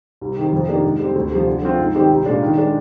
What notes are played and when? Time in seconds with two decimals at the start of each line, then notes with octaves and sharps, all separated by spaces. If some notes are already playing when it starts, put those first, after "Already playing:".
0.21 C2
0.37 C3 D#3
0.52 F2
0.68 C3 D#3 A#3 D4
0.84 G#2
0.99 G3 C4
1.15 D2
1.31 C3 F3
1.47 D3
1.62 F3 C4 F4
1.78 G#2
1.94 D#3 G3 C4 G4
2.11 C2
2.25 A#2 G#3 D4
2.42 D#3
2.58 G#3 D4